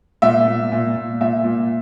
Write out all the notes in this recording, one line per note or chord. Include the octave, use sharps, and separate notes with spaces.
A#2 E5
A#2
A#2
A#2
A#2 E5
A#2